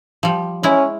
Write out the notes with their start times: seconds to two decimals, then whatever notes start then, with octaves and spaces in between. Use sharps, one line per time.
0.23 F3 G3
0.63 G#3 C#4 E4